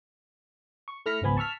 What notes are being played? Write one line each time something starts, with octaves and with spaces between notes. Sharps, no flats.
C#6
A3 E4 F6 A#6 B6 C#7
G#1 C#2 F3 B3 G#5 B5
A5 C#6 E6 F6 B6